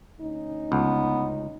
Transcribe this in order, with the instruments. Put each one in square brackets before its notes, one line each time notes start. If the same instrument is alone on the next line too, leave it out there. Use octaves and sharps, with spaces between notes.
[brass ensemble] D2 C#4 D#4
[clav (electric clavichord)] C#2 [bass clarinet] B3